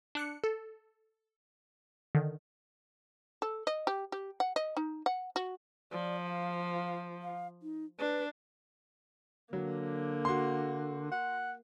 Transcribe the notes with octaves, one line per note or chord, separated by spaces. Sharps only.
D4 F#6 C#7
A4
D3 D#3
A4
D#5
G4
G4
F#5
D#5
D#4
F#5
F#4
F3 D5
F5
F5
D#4
D4 B4
D3 F#3 A#3
F#4 C6
F#5